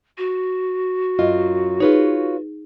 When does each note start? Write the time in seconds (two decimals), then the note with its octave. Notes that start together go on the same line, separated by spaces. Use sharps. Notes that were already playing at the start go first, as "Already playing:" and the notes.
0.18 F#4
1.19 F#2 F4 D#5
1.80 D#4 F4 G#4 B4 C#5